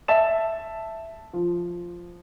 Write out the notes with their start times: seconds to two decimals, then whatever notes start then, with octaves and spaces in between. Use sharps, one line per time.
0.08 E5 A5 A6 E7
1.33 F3